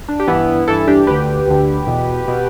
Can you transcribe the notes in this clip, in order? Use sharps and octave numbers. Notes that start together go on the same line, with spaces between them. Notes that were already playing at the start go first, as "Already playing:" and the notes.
D4
G4
G2 E3 B3 E4
G2 E3 E4 A4
D4 G4
D2 D3 G4 B4
D2 D3
E2 B2
B2